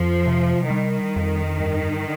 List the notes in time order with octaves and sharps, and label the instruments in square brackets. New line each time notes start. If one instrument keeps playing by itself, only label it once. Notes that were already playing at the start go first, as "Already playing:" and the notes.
Already playing: [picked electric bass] F2 [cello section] F3
[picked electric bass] C3
[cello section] D#3 [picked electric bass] G3
[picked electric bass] F2
G2